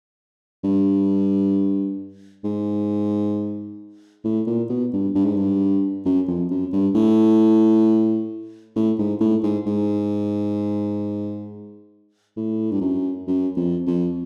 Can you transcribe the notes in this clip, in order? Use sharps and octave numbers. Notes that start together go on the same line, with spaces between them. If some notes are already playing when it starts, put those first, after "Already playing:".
G2
G#2
A2
A#2
B2
G2
G2
G#2
G2
F#2
F2
F#2
G2
A2
A2
G#2
A2
G#2
G#2
A2
G2
F#2
F#2
F2
F2